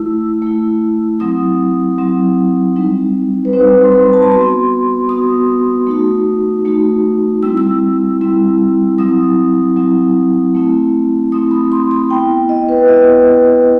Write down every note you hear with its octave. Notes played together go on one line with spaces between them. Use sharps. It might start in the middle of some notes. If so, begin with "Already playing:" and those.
Already playing: A3 E4 E6
A3 E4
F#3 C4 E4 D#6
F#3 C4 E4
G3 C4 D#4
B4
G3 C4 D#4 C5
C6
B5
A5
B5
B3 F#4 C6
B3 F#4 D#6
A3 D#4 F#4
A3 D#4 F#4
G3 C4 E4 E6
E6
G3 C4 E4
F#3 C4 E4 D#6
F#3 C4 E4
A3 C4 E4
A3 C4 E4 D#6
B5
C6
B5
B3 E4 G5
D#5
B4
B3 E4 D#5